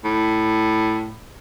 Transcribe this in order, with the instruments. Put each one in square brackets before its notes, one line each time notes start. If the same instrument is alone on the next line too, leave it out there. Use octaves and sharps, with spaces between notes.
[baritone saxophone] A2